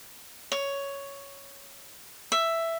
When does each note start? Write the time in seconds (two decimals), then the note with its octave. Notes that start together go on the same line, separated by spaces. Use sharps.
0.52 C#5
2.32 E5